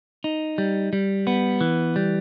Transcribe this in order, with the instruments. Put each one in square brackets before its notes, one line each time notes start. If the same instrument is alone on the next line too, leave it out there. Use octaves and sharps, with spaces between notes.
[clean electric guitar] D#4
G3
G3
B3
E3
G3